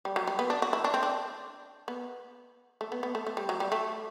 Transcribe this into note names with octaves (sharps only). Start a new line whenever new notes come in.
G3
F#3
G3
B3
D4
F#4
E4
D4
C4
D4
B3
A3
B3
B3
A3
A3
G3
F#3
G3
A3